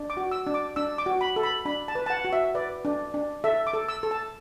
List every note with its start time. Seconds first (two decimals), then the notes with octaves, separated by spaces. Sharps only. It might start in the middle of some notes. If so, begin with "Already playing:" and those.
Already playing: D4
0.10 D6
0.17 F#4
0.31 E6
0.47 D4
0.54 D6
0.76 D4 E6
0.98 D6
1.06 F#4
1.21 B5
1.36 A4
1.43 B5
1.65 D4 B5
1.88 A5
1.95 B4
2.06 A5
2.10 F#5
2.25 F#4
2.33 E5
2.55 B4 D5
2.85 D4
3.14 D4
3.44 A4 E5
3.67 D6
3.74 A4
3.89 E6
4.03 A4
4.11 A5